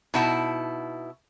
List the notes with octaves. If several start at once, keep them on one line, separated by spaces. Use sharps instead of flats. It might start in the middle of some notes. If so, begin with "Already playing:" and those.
B2 D#4 E4 F#5 A5